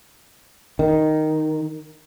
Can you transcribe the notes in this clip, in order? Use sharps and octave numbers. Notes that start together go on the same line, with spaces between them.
D#3